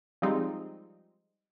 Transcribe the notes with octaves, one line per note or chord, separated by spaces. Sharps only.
F3 G3 G#3 C4 D#4